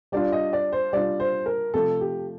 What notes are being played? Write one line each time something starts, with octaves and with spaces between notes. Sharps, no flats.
G3 D4 F4 D5
D#5
D5
C5
G3 D4 F4 D5
C5
A#4
C3 F3 A3 A4
G4